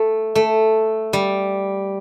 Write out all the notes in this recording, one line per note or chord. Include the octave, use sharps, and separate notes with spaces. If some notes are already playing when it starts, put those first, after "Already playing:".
Already playing: A3
A3
G3